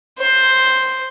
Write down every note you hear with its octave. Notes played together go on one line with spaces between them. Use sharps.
C5